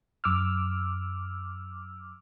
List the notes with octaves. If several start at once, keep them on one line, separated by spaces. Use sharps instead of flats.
F#2 D6 E6 F6